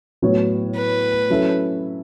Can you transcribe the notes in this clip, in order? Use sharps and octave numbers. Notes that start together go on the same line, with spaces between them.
A2 F#3 B3 F#4 C#5
B4
F#3 C#4 E4 A4